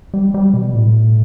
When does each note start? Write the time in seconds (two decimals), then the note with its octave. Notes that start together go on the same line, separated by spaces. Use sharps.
0.14 G3
0.34 G3
0.54 B2
0.75 A2